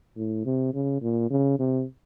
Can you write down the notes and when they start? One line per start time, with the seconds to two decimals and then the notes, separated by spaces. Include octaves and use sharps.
0.16 A2
0.45 C3
0.74 C#3
1.02 A#2
1.30 C#3
1.60 C3